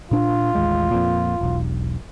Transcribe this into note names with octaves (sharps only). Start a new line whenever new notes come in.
A#2 D4 F4
A1 D#2 G#3
F2 A#2
E1 B1